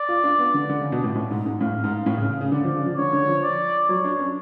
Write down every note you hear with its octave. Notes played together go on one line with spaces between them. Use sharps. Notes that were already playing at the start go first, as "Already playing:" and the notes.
Already playing: D5
F4
D4
B3
D3
D3
C#3
B2
A2
A2
G#2
G#2
A2 F5
G#2
A2
C#3
C#3
C#3
D3 D5
F3
C#3
F3
D3 C#5
D3
F3
D5
F#3 C#5
D4
C#4